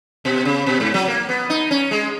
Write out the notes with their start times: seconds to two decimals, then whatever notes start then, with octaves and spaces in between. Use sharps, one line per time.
0.25 B2
0.45 C#3
0.66 B2
0.80 G#2
0.94 F#3
1.08 A#3
1.29 B3
1.50 D#4
1.71 C#4
1.91 G#3